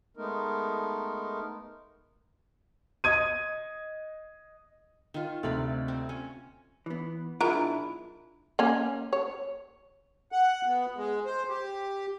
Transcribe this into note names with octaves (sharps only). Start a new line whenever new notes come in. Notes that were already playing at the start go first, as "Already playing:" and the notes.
G#3 A3 B3 D#4 A#4
D#5 D#6 G#6 D#7
D#3 F4
D2 C3 D5 F5 B5
C4
C#4
E3 B3
B1 G#3 D4 E4 F4 A#4
A#3 C#4
C#5
F#5
B3
G#3
C5
G4